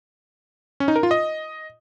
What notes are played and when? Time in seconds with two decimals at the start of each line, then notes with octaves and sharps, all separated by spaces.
0.80 C#4
0.88 D#4
0.96 A#4
1.03 F4
1.11 D#5